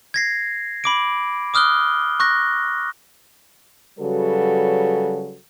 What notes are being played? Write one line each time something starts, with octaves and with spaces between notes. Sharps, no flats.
G#6 A#6 C7
B5 D6 D7
D6 D#6 F6 F#6 G7
C#6 F#6 A#6
C#3 F#3 G3 F#4 A4 B4